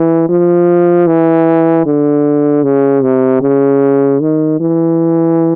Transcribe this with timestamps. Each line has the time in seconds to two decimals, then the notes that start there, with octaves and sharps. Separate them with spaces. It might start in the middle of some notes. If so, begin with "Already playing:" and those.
Already playing: E3
0.29 F3
1.07 E3
1.86 D3
2.64 C#3
3.03 C3
3.41 C#3
4.21 D#3
4.60 E3